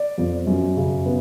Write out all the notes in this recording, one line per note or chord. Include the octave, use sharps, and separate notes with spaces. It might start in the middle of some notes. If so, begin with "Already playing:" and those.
Already playing: D5
F2
F#2
C#3
B3